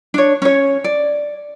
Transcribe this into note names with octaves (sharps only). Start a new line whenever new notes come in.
D4 C#5
C#4 C#5
D5